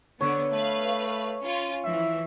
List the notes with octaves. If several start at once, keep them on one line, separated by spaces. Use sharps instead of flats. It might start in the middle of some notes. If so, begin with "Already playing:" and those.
D3 B3 C#5
A3 B4 F5
C#4 F4
E3 F3 E5